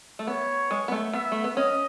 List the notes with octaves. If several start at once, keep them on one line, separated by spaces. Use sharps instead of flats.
A3
B3 C#5
G#3
B3
A3
B3 E5
A3
B3
C#4 D#5